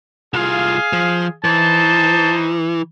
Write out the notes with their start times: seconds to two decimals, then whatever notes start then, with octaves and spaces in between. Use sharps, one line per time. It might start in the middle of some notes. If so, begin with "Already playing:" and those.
0.34 C2 F4 G#4 F5
0.93 F3
1.44 E3 D#4 C5 A5